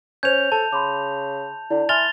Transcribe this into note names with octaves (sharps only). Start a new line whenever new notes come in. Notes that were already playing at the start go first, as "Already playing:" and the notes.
C#4 C5 G6 G#6 F7
A4 A5
C#3 B5 C6 D6
D3 E4 D5
E4 G#5 C6 F6 A6 F7 G7